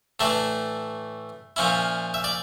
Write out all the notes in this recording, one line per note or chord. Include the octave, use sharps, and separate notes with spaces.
A2 E3 A3 D4 E5
A#2 F3 C#4 E4
E5
D5